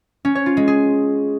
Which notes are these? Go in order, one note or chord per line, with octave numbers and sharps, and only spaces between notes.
C#4
C#5
F4
G#3
G#4